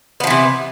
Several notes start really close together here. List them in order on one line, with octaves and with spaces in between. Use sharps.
B3 F3 E3 C3